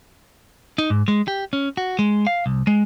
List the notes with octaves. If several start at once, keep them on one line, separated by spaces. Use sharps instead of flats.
D#4
G#2
G#3
G4
C#4
F#4
G#3
F5
C2
G#3